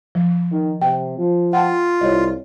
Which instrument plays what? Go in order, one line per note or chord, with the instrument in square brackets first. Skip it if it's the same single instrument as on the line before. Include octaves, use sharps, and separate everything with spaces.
[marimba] F3
[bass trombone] D#3
[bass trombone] C3 [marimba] G5
[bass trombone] F3
[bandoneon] F4 [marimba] F#5 G5 A5
[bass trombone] C2 [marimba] C#5 D#5